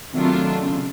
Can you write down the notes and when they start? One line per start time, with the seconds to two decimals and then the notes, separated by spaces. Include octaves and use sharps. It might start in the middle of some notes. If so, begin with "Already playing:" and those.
0.13 C3 D#3 F#3 A3 D4 F4
0.62 C#3